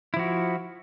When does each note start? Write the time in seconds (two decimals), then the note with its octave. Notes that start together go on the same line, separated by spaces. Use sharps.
0.14 E4
0.17 F3
0.19 F#4